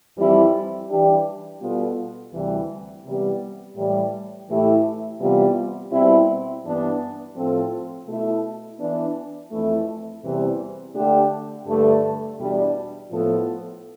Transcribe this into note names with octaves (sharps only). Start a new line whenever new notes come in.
F2 E3 G3 C4 E4
E3 G3 D4 G4
B2 G3 B3 F4 A4
D2 C3 E3 G3
C3 E3 G3 B3
A2 E3 G3
A2 E3 A3 E4 G4
C3 E3 G3 B3 F4
B2 G3 C4 E4
G2 E3 B3 D4
A2 F3 C4 F4 A4
B2 A3 E4 A4
E3 B3 D4
F2 E3 A3 E4
E2 C3 E3 G3 C4
D3 A3 D4 G4
G2 D3 A3
E2 B2 G3 D4
A2 F3 B3 F4 A4